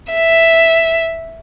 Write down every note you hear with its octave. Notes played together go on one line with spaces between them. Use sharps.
E5